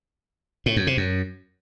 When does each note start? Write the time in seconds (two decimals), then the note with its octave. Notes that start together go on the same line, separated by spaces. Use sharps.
0.66 A2
0.76 F#2
0.87 C3
0.97 F#2